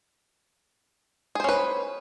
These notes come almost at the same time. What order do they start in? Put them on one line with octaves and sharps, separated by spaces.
G#4 C5 C#4 B4